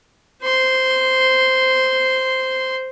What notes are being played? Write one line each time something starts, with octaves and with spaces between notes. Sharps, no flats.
C5 C6